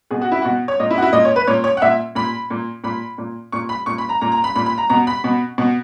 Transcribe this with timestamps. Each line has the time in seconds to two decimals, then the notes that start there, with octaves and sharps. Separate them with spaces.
0.11 B2 G#4
0.21 F#4
0.32 E4
0.42 B2 F#4
0.68 C#5
0.80 A#2 D#5
0.91 E4
0.98 F#4
1.02 E4
1.13 A#2 D#5
1.25 C#5
1.36 B4
1.47 A#2 C#5
1.64 C#5
1.77 F#5
1.82 A#2 E5
2.15 A#2 B5
2.50 A#2
2.84 A#2 B5
3.18 A#2
3.52 A#2 C#6
3.69 B5
3.86 A#2 C#6
3.98 B5
4.09 A#5
4.21 A#2 A#5
4.32 A#5
4.44 B5
4.55 A#2 B5
4.66 B5
4.78 A#5
4.89 B2 A#5
5.07 B5
5.24 B2
5.58 B2